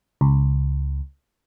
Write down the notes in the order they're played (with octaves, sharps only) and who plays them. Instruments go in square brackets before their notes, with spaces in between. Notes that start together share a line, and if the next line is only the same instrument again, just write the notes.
[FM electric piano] C#2